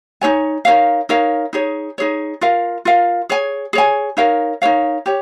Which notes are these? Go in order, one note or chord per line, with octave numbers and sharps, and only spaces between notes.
D#4 G#4 C#5 G#5
D#4 A#4 C#5 F5
D#4 A#4 C#5 F5
D#4 G#4 C#5
D#4 G#4 C#5
F4 A#4 F5
F4 A#4 F5
G#4 C#5 G#5
G#4 C#5 G#5
D#4 A#4 C#5 F5
D#4 A#4 C#5 F5
G4 C#5